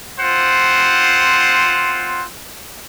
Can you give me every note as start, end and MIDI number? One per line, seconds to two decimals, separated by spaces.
0.20 2.24 60
0.20 2.24 65
0.20 2.24 72
0.20 2.24 78